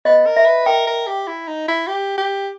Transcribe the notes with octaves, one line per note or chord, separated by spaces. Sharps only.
B3 D#5
A#4
E5
B4
A#4 G5
A#4
G4
E4
D#4
E4
G4
G4